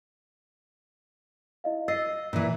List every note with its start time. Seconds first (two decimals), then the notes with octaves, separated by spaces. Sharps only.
1.64 E4 D#5 F5
1.88 D#5 E6 A6 C7
2.33 A#2 E3